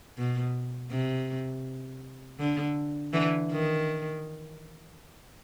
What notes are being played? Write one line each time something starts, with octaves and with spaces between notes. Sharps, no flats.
B2
C3
D3
D3 E3
D#3